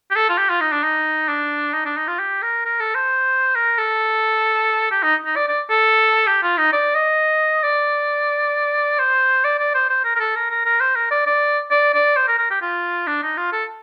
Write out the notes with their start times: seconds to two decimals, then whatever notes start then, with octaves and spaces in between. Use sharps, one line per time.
0.11 G4
0.16 A4
0.29 F4
0.38 G4
0.49 F4
0.61 D#4
0.72 D4
0.83 D#4
1.29 D4
1.74 D#4
1.85 D4
1.97 D#4
2.08 F4
2.19 G4
2.42 A#4
2.65 A#4
2.80 A4
2.95 C5
3.55 A#4
3.78 A4
4.91 G4
5.03 D#4
5.26 D#4
5.36 D5
5.48 D5
5.70 A4
6.27 G4
6.43 F4
6.58 D#4
6.73 D5
6.95 D#5
7.63 D5
8.99 C5
9.44 D5
9.59 D5
9.75 C5
9.90 C5
10.04 A#4
10.16 A#4
10.20 A4
10.36 A#4
10.50 A#4
10.65 A#4
10.81 C5
10.96 A#4
11.11 D5
11.26 D5
11.71 D5
11.94 D5
12.17 C5
12.28 A#4
12.38 A#4
12.51 G4
12.62 F4
13.07 D4
13.23 D#4
13.37 F4
13.53 A4